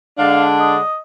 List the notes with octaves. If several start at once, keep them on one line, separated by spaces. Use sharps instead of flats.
D3 G#3 D4 F5
D#5